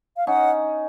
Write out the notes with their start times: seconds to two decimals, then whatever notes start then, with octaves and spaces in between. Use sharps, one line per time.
0.17 F5
0.27 C#4 D#4 F#5